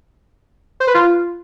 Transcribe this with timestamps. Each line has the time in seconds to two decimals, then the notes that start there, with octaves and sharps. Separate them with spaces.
0.80 C5
0.87 B4
0.94 F4